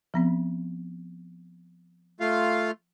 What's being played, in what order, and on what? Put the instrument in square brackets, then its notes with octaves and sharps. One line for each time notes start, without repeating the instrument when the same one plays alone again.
[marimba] F3 B3 C4
[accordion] A3 F4 F5